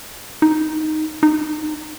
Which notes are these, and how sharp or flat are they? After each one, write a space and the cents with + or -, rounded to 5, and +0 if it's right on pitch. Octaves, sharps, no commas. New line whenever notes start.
D#4 +0
D#4 -25